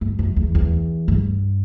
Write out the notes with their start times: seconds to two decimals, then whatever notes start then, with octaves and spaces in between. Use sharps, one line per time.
0.01 G2
0.19 F#2
0.36 E2
0.55 E2
1.08 G2